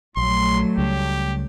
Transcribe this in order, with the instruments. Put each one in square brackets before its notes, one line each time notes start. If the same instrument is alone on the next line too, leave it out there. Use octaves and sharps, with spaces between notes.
[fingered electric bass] A#1 [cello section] F#3 A3 [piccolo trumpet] C6
[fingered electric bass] C#2 C#3 G3 [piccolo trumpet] G4